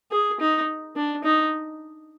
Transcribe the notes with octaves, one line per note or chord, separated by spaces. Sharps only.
G#4
D#4
D4
D#4